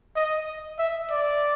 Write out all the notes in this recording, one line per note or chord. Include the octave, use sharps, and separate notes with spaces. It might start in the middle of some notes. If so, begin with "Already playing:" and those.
D#5
E5
D5